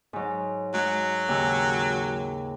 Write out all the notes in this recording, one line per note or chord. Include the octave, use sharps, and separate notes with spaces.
G#2 F#3
F#3 G#3
D#2 C#3 E6